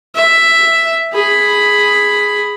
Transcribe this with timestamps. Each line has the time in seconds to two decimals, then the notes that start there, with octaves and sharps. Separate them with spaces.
0.15 E5
1.13 G#4 B5